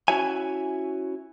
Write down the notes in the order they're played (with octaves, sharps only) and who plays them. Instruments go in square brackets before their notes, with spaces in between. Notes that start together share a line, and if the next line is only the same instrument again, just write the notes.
[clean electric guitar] C#4 E4 F#4 C#5 E5 G#5